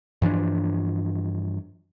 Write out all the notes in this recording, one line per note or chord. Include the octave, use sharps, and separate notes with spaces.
G2 E3 F3 D4